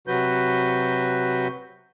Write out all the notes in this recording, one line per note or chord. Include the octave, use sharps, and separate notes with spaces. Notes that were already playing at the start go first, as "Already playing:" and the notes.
C3 F#3 F#4 B4 G6